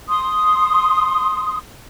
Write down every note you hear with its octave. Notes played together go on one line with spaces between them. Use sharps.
C6 D#6